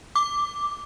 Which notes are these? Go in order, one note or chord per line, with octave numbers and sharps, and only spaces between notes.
D6